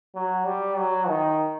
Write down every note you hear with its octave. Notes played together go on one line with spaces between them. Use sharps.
F#3
G3
F#3
D#3